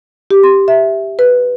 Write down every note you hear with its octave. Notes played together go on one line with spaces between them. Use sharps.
G4
C6
E5
B4